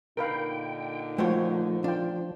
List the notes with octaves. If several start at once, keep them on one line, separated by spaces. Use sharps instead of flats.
A#2 D3 D#4 A#4 B4 F5 G5
F3 A3 F4 F#4 C5 C#5 G5
D4 F4 G5